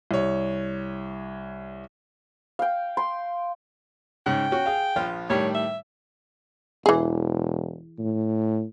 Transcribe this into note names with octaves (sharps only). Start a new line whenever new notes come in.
C2 C#5
F5 G5
C6
G#2 C#3 G5
C#4 F#4
G#4 F5
A#1 F3 F4
A2 D#3 G3 C#5
E5
E1 E3 G#4
A2